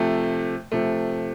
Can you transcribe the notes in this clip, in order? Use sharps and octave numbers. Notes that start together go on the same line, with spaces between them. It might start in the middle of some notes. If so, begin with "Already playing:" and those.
Already playing: C3 F3 A3
C3 F3 A3